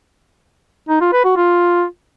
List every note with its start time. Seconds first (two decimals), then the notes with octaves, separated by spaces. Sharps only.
0.89 D#4
1.01 F4
1.13 B4
1.25 F#4
1.37 F4